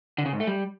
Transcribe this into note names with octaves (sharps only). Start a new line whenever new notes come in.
D3
C#3
G#2
A3
G3